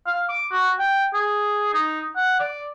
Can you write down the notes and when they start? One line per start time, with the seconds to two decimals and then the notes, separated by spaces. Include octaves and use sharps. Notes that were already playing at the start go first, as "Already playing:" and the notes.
0.07 F5
0.29 D6
0.52 F#4
0.79 G5
1.13 G#4
1.73 D#4
2.16 F#5
2.40 D5